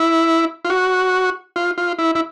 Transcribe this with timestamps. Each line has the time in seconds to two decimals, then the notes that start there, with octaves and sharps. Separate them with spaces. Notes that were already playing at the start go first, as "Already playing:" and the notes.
Already playing: E4
0.65 F4
0.70 F#4
1.56 F4
1.78 F4
1.99 E4
2.15 E4